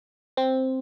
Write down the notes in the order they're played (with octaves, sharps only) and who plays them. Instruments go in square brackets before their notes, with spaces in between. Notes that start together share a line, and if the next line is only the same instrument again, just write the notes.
[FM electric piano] C4